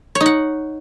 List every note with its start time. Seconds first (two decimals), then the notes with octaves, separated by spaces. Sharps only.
0.15 C#5
0.21 D#4
0.26 F#5